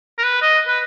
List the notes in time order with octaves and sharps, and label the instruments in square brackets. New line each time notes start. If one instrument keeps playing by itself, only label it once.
[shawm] A#4
B4
D#5
B4